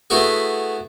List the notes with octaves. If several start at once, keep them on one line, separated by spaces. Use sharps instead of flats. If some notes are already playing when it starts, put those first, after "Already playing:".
A3 B3 E4 F#4 G#4